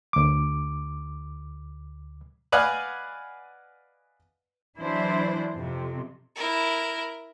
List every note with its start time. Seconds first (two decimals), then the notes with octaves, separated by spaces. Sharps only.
0.13 D2 D6
2.52 B4 D5 D#5 F5 F#5 G#5
4.79 E3 F#3 D4 E4 C5
5.56 F2 C3
6.36 E4 A#4